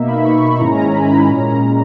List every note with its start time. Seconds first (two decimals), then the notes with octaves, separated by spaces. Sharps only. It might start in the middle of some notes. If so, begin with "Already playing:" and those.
Already playing: B2 A#3 D#4 E5
0.08 B5
0.25 C#6
0.43 B5
0.60 G#2 D#3 G#3 C#4 E4 A#5
0.77 G#5
0.94 B5
1.11 B5
1.28 A#2 G#3 C#4 A#5